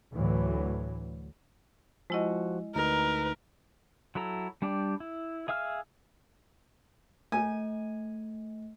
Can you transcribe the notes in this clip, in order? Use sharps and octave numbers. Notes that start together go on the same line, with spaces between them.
D2 A2 E3 F#3
F3 G#3 E4 F#4 D#5
D2 D#4 A#4 B4
F#3 E4 A4 A#5
G3 D4 G4 D5
E4
G#4 E5 F5 E6 F6
A3 G#5